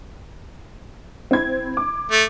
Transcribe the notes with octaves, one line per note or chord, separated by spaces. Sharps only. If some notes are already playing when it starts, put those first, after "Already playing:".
C4 E4 G#6
D6
A3